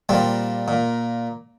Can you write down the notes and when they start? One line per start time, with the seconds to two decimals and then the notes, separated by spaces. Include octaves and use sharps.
0.09 A#2 G3 C4
0.68 A#2